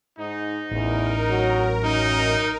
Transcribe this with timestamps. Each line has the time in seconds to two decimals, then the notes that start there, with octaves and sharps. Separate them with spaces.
0.19 G#2 D#4
0.71 A1 E2 A#4
1.30 F#3
1.83 F#2 D#4